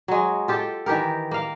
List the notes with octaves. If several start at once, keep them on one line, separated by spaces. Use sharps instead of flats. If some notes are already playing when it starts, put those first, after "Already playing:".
F#3 G#3
F4 G4 A4
D#3 E3 G4 A#4
A#3 F5